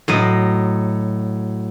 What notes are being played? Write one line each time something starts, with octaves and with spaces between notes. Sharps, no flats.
A2 F#3 D#5